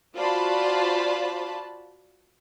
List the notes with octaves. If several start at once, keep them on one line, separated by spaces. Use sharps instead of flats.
F4 F#4 C5 D5 A5 B5